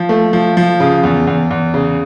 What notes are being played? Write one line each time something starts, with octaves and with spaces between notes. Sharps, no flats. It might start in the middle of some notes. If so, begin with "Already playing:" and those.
Already playing: F3
A3
F3
F3
C#3
E2
E2
E2
C#3